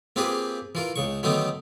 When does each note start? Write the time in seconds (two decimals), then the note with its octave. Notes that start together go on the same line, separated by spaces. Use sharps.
0.16 A#3 C4 F4 G4 G#4 B4
0.75 E3 F4 A#4
0.96 C#2 C#3 C#6
1.23 D3 D#3 F#3 A3 B3 D#4